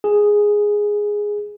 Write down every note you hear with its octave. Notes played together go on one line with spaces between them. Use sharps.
G#4